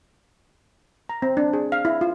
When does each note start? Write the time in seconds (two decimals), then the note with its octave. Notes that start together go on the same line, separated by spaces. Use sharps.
1.09 A#5
1.22 C4
1.37 D4
1.53 G#4
1.72 F5
1.85 E4
2.01 F4